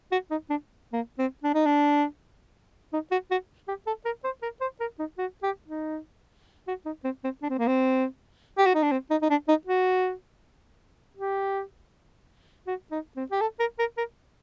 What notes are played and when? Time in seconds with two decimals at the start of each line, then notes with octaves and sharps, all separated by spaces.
0.12 F#4
0.31 D#4
0.50 D4
0.93 A#3
1.18 C4
1.44 D4
1.54 D#4
1.66 D4
2.93 D#4
3.11 F#4
3.31 F#4
3.68 G4
3.87 A4
4.05 A#4
4.24 C5
4.42 A#4
4.61 C5
4.80 A#4
4.99 D#4
5.18 F#4
5.43 G4
5.68 D#4
6.68 F#4
6.86 D#4
7.04 C4
7.24 C4
7.42 D4
7.50 C4
7.59 A#3
7.67 C4
8.58 G4
8.66 F#4
8.75 D#4
8.83 D4
8.92 C4
9.11 D#4
9.22 D#4
9.30 D4
9.48 D#4
9.67 F#4
11.17 G4
12.67 F#4
12.91 D#4
13.16 C4
13.31 G4
13.41 A4
13.60 A#4
13.79 A#4
13.97 A#4